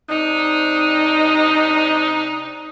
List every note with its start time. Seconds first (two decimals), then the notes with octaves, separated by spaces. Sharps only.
0.08 C3 D4 D#4